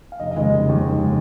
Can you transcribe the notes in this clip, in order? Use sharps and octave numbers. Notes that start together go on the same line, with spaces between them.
F5
F1 D#5
D#5
D#2 C#3 G#3
F1
D#2 C#3 G#3
F1
C#3 G#3